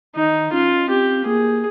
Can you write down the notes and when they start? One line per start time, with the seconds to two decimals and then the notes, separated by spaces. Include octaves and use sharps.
0.15 D#3 D#4
0.53 C#4 F4
0.89 C4 G4
1.26 A#3 G#4